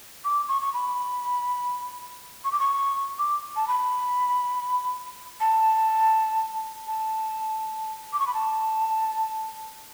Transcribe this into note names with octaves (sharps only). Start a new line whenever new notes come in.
D6
C#6
C#6
B5
C#6
D6
C#6
D6
A5
B5
A5
A5
D6
C#6
B5
A5